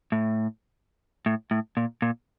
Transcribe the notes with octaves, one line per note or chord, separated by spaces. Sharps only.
A2
A2
A2
A#2
A#2